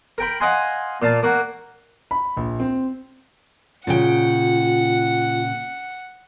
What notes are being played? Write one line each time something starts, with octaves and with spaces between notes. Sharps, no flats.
A#4 G5 B5
D#5 F5 F#5 G#5 C6
A#2 F5 A5
A#3 F#4
B5
A#1
C4
A#2 C#3 F4 F#5 G5